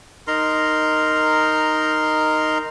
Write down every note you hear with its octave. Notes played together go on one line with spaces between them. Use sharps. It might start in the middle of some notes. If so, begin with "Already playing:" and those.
D#4 A#4 A#5 C6